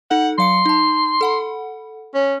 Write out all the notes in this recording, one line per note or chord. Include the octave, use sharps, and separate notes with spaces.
D#4 A4 F#5
F#3 F5 C6 C#7
D#4 A5
A4 F#5 B5
C#4